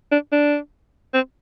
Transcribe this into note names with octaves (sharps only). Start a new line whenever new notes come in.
D4
D4
C4